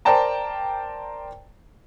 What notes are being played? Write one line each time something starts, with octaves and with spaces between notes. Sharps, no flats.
A#4 C5 D5 G5 A5 A#5